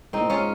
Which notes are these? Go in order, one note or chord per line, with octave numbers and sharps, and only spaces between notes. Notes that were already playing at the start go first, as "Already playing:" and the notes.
G#2 C4 D#4
A#2
G#2 C#4 F4